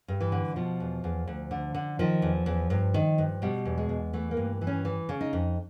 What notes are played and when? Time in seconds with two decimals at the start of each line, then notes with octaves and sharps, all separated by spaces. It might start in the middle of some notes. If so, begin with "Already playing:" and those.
0.08 G2
0.21 E3
0.32 D3
0.56 B2 F3
0.80 E2
1.04 E2
1.28 D2
1.51 D3
1.74 D3
1.99 D#3 F3
2.22 E2
2.46 E2
2.70 G2
2.94 D#3
3.18 G2
3.42 B2 G3
3.65 E2
3.77 G#3
3.89 E2
4.13 E3 A3
4.31 A#3
4.37 G2
4.61 E3
4.67 C#4
4.85 E3
5.09 C#3
5.21 D#4
5.33 F2